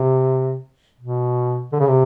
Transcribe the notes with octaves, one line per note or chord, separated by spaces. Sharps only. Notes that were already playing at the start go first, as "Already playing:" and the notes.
Already playing: C3
B2
D3
C#3
C3